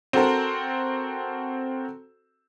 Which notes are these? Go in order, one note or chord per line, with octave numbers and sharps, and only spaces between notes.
C4 F#4 A4 A#4 C5